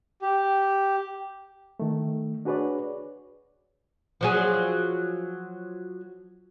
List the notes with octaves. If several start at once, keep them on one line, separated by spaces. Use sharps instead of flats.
G4
D#3 A3
D4 F#4 G#4 B4 C#5 D5
F3 F#3 G#4